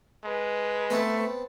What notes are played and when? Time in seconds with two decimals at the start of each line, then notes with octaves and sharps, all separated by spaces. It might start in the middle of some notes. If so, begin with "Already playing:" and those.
0.24 G#3 B4
0.90 A3 B3 C4 A5